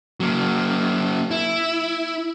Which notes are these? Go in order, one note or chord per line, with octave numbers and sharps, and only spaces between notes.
F#3 A#3
E4